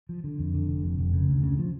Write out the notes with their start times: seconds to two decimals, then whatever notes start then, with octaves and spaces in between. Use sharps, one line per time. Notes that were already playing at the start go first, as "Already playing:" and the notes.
0.09 F3
0.24 D3
0.39 F2
0.54 D3
0.69 F1
0.84 F2
0.99 F1
1.14 C#3
1.28 D2
1.43 C#3
1.59 F3